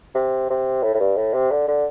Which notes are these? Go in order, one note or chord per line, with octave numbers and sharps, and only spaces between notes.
C3
C3
A2
A2
G2
A2
C3
D3
D3